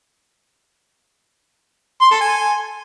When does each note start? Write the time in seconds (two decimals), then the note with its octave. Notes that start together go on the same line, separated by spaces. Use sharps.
2.01 C6
2.11 A4
2.21 G#5